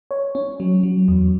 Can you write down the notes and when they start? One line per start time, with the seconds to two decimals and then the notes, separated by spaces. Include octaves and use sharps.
0.11 C#5
0.35 C#4
0.60 F#3
0.83 F#3
1.08 E2